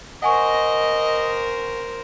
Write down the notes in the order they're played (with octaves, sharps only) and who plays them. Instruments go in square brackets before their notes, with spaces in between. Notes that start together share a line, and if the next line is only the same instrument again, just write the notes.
[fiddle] A#4 C5 [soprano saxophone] D#5 [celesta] F#5 G#5 C#6